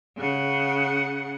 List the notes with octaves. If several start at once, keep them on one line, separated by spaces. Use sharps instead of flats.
C#3 F#5